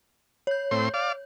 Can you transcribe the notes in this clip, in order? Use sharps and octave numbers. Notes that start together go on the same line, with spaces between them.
C#5 G6
A2 C4 C6
D5 F5